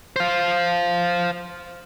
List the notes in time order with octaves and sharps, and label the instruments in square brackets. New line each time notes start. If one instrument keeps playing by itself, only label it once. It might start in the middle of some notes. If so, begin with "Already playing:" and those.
[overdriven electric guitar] C5 F5